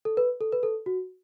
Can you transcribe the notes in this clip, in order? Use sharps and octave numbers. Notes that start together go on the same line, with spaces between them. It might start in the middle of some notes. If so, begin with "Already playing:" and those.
A4
B4
A4
B4
A4
F#4